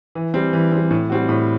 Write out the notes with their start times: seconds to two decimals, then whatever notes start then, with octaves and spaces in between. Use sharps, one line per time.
0.15 E3
0.34 G3 C4
0.53 E3
0.72 G3 C4
0.91 A2
1.10 G3 C4 F#4
1.29 A2